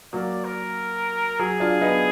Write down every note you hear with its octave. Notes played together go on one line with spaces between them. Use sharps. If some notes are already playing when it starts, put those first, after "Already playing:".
F#3 A#3 D5
A#4
F#3 G#4
D4 F4
B3 D#4